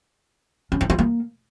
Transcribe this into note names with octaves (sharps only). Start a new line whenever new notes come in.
C#4
E4
F4
A#3